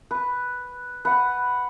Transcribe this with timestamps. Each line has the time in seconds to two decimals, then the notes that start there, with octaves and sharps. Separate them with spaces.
0.11 B4
1.05 B4 F#5